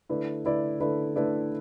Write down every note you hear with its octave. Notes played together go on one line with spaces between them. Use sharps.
D3 A3 E4 B4 D5
D3 A3 E4 B4 D5
D3 A3 E4 B4 D5
D3 A3 E4 B4 D5